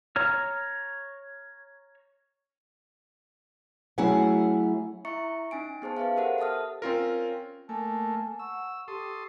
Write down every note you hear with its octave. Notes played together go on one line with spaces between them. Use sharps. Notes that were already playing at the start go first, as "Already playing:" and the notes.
C#5 A#5 F6
F#3 A3 C#4 E4 G#4 F#5
E4 E5 A#5 C#6 C#7
C#4 D#4 G#5 D7
B3 G#4 C5 A5
G#4 B4 E5 F5
G4 A4 A#4 C5 F#5
A4 E5 A5 D#6 F6
C4 C#4 F4 A#4
A3 A#3 G#5 A5
F#5 C#6 E6
G4 A4 C6 D#6